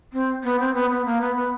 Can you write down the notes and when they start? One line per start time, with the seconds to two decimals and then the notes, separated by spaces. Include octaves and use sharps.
0.13 C4
0.44 B3
0.59 C4
0.74 B3
0.90 B3
1.05 A#3
1.21 B3
1.36 B3